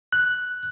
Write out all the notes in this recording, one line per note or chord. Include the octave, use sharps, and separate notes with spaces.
F#6